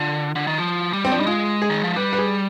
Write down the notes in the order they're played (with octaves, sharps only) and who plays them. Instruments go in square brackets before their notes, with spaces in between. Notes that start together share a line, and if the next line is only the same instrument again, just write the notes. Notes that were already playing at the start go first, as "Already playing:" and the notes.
Already playing: [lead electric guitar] D3 [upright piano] F4
[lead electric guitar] D3
D#3
F3
G3
[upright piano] C4
[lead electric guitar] F3 [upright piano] D4
[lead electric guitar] G3 [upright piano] D#4
[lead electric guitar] G#3 [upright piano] F4
[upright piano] G#4
[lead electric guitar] D#3
F3
[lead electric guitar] G3 [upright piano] B4
[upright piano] B4
G#4